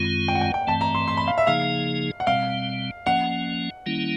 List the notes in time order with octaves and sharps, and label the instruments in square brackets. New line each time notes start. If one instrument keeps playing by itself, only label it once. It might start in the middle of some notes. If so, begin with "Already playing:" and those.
Already playing: [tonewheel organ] F#2 D#3 G#3 C4 F4
[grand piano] G5
F#5
G5
G5
[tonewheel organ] G2 E3 A3 C4 [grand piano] A5
[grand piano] A#5
C6
C6
B5
F5
E5
[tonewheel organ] C#3 F3 A#3 D#4 G#4 [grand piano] F5
[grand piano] F#5
[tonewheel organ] B2 G3 C4 [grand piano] F5
[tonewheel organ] F3 A#3 C#4 [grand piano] F#5
[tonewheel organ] D#3 G3 A#3 C#4 E4